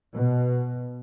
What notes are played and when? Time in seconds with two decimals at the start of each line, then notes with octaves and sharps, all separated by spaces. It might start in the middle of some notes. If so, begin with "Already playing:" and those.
0.14 B2